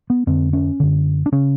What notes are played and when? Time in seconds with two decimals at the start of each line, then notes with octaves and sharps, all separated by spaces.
0.10 B3
0.27 F2 D3 C4
0.53 C#4
0.80 F#2 D3
1.26 D4
1.32 C#3 C#4